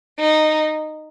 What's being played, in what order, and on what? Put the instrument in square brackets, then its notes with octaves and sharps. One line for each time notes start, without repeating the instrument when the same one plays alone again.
[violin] D#4